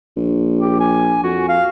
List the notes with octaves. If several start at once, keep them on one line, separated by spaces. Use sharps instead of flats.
A#1
G4
G#5
F2 F#4
F5